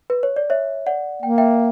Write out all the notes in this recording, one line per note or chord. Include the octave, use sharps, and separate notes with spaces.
B4
C#5
D5
C#5 E5
D5 F#5
A#3 G5
E5 G5